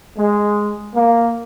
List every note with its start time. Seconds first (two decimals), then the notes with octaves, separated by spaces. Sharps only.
0.17 G#3
0.95 A#3